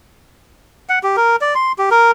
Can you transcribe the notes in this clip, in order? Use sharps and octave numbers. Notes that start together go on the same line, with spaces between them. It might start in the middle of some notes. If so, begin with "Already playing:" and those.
F#5
G4
A#4
D5
C6
G4
A#4